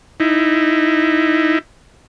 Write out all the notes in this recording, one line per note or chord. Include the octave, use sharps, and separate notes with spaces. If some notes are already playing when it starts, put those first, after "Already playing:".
D#4 E4